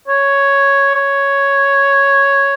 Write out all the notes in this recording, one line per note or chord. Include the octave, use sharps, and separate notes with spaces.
C#5
C#5